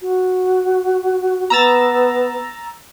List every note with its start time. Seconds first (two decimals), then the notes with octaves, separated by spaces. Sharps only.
0.01 F#4
1.50 B3 A#5 E6 A6